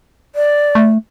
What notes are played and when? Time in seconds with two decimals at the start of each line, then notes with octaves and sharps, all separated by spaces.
0.35 D5
0.75 A3